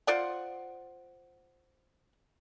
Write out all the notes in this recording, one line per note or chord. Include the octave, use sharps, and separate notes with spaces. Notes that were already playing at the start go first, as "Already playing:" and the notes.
F4 C5 D5 F#5